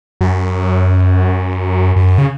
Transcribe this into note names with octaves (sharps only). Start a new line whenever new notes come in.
F#2
F#2
C#3